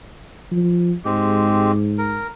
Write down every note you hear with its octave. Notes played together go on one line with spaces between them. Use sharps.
F3
G#2 G#3 C4 G4
A#4